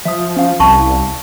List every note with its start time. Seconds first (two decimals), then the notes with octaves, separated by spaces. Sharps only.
0.05 F3 E5 D#6
0.37 C#4 F5
0.60 C2 A5 C#6